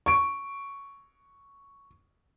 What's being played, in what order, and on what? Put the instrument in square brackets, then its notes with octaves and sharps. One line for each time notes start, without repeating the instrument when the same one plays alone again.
[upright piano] C#6 D7